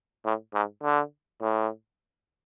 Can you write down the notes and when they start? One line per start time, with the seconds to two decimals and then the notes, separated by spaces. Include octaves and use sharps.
0.25 A2
0.54 G#2
0.83 D3
1.41 A2